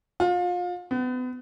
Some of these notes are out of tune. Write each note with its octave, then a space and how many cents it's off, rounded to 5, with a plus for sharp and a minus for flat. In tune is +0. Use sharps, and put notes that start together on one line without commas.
F4 +30
B3 +35